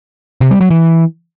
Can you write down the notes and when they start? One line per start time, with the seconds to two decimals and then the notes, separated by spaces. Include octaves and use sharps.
0.41 C3
0.51 G3
0.61 F#3
0.70 E3